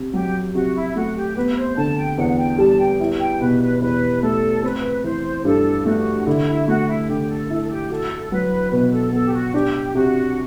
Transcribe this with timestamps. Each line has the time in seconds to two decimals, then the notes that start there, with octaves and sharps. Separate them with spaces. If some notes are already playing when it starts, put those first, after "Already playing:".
Already playing: C3
0.13 F#3 G4
0.54 C3 F#4
0.75 E4
0.96 A3 F#4
1.16 G4
1.36 B3 B4
1.57 C5
1.77 D3 A5
1.98 G5
2.18 E2 F#5
2.29 F#5
2.38 G5
2.58 G3 A5
2.79 G5
3.00 E4
3.20 G5
3.41 B2 B4
3.62 B4
3.81 E2 B4
4.22 A3 A4
4.63 C4 B4
5.04 E3 C5
5.45 G2 A4
5.85 A3 F#4
6.27 D3 E4
6.48 E4
6.67 A3 F#4
6.88 E4
7.08 D3 G4
7.29 A4
7.50 E4 A4
7.62 A4
7.70 G4
7.90 F#4 A4
8.31 F#3 B4
8.72 B2 B4
8.92 A4
9.13 B3 A4
9.25 G4
9.33 F#4
9.54 D4 G4
9.95 C3 F#4